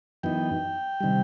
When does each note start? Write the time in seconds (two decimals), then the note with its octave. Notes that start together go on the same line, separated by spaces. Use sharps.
0.23 F#2 E3 B3 D#4 G5
1.00 C3 D#3 G3